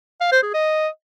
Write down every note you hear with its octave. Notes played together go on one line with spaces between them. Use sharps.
F5
C5
G#4
D#5